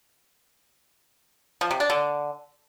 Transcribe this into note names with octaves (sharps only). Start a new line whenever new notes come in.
F3
C3
D4
D3